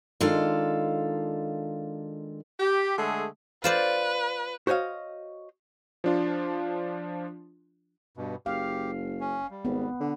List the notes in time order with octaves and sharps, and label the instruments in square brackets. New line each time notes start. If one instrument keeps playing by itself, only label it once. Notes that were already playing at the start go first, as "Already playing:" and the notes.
[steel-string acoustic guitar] D#3 G#3 D4 F4 A4 F5
[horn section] G4
D3 G#3 A3 G#4
[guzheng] F4 C5 D5 [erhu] B4
[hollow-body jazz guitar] F#4 C5 C#5 D#5 F5
[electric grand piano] F3 D4 F4
[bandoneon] G2 B2
[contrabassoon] F#1 [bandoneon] G4 [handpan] F5
[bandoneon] C#4
G3
[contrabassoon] G#1 [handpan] B3
[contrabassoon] D3